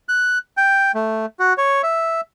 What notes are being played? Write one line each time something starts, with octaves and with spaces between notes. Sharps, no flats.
F#6
G5
A3
F#4
C#5
E5